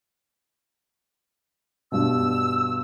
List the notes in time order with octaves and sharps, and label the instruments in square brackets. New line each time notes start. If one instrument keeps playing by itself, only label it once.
[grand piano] G2 B2 [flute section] E6